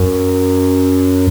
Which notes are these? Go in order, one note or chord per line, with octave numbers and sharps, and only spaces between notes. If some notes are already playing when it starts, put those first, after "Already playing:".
Already playing: F#2